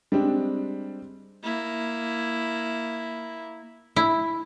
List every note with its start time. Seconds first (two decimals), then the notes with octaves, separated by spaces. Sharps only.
0.12 G3 G#3 C4 D4
1.44 A#3 E4
3.96 E4